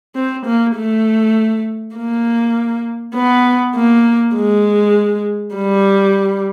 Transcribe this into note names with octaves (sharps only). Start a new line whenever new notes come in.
C4
A#3
A3
A#3
B3
A#3
G#3
G3